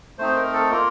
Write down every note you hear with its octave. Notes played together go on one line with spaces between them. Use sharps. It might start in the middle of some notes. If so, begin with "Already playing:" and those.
A3 C4 D#4 C5
A#4
A4
A#3 F4 A#4